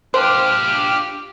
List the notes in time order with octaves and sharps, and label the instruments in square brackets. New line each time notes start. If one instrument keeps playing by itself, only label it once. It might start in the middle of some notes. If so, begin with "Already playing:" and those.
[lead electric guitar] D4 F4 [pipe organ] G4 G5 F6 [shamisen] C5